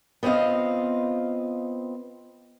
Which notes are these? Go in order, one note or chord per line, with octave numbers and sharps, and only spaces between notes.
B3 C4 F4 D#5 F5